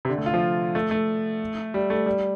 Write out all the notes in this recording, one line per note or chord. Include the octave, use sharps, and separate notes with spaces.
C3
D3
A3
F4
F3
A3
A3
G3
A3
G3